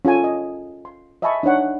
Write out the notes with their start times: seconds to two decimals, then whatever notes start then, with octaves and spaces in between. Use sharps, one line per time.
0.05 C#4 F4 A4 G#5
0.24 D#5
0.85 C6
1.22 D#5 E5 G#5 A5 B5 C#6
1.43 D4 D#4 C#5 F#5